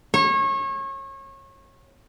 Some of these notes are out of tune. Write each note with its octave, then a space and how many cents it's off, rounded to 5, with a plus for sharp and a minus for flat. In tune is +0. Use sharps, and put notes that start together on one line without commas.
C#5 -30